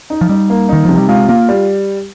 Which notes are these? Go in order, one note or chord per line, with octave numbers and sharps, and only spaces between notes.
D#4
F3
G3 D#4
A#3
D#3 D#4
C3 F3
G3
G#3 F4
A#3 F4
G3